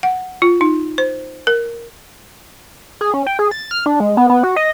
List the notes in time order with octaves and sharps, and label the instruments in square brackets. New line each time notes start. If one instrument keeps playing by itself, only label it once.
[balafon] F#5
F4
D#4
C5
A#4
[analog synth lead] G#4
C#4
G5
G#4
A6
F6
D4
G#3
B3
B3
F#4
D#5